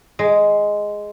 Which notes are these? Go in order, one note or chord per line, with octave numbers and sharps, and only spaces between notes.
G#3